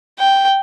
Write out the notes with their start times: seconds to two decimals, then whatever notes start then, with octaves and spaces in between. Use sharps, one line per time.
0.19 G5